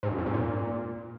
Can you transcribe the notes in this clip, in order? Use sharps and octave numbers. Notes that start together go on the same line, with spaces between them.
G#2
F#2
F2
G#2
A#2